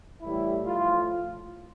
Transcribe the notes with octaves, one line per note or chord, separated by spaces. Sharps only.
A2 E3 G3 E4
A2 F3 F4